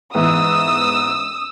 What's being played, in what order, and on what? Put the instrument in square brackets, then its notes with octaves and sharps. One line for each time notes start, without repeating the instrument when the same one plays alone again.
[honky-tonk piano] G#2 E3 B3 [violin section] D#6 E6